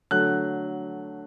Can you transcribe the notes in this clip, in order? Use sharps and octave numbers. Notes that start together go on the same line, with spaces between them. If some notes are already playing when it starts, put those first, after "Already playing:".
D3 F#3 A3 F#6